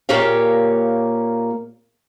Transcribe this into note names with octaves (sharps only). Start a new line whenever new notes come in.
A#2 A#3 G4 C#5 F5